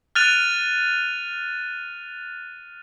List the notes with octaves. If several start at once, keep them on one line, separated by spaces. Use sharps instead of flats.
F6 F#6 A6 D#7 F7